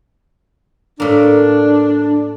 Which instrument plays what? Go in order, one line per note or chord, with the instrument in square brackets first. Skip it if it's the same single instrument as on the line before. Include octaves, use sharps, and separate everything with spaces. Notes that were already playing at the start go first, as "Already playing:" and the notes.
[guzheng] A2 A#3 [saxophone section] D4